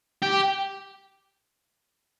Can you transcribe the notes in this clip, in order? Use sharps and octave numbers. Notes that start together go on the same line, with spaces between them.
G4